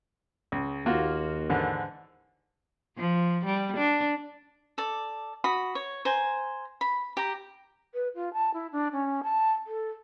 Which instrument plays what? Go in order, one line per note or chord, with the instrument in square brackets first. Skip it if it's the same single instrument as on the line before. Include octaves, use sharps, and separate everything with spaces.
[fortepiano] C#2
[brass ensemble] D#2 [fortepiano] A#3 F4 F#4
[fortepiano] G#2 D3 E3
[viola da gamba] F3
G3
D4
[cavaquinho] A4 D5
F#4 B5 D#6
C#5
C5 G#5 A#5
B5
G4 A#5
[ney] B4
F4
A5
E4
D4
C#4
A5
A4